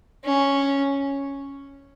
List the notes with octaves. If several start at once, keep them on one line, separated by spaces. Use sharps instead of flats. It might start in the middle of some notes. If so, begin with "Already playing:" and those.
C#4